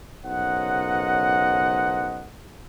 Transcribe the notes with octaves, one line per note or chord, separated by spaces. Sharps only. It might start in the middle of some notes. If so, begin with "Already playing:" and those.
B1 C#3 A#4 C5 D#5 F#5